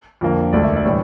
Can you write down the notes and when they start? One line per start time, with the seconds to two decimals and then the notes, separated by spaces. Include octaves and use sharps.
0.21 F2 D3 F3 A#3
0.53 E1 D2 D3 A3 D5
0.64 E5
0.76 D5
0.85 A2 E3 G3